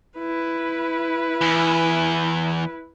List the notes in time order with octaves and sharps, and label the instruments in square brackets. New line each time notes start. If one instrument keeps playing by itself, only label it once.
[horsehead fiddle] E4 B4
[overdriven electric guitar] E2